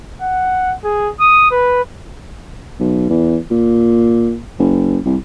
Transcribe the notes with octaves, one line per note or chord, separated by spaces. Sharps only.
F#5
G#4
D#6
B4
B1
E2
A#2
F#1
C2